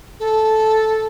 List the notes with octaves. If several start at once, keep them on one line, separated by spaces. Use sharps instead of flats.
A4